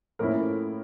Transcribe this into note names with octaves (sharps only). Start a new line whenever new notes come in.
A2 F3 A#3 C#4 E4 A#4